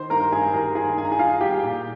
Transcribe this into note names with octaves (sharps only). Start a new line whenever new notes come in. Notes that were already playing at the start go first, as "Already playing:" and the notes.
Already playing: D#3 C5 C6
G2 A#4 A#5
G2 G#4 G#5
G3 A#4 A#5
D#3 G#4 G#5
G2 G#5
A#5
G#4 G#5
G2 F4 F5
G3 G4 G5
A#2